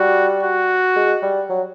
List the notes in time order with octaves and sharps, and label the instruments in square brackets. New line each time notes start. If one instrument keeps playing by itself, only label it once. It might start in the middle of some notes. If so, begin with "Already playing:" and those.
Already playing: [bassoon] G3 [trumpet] F#4
[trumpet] F#4
[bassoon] G#3
G3
F#3